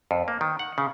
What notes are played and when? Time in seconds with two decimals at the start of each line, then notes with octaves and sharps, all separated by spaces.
0.11 F2
0.28 A#3
0.41 D#3
0.59 F#5
0.78 C#3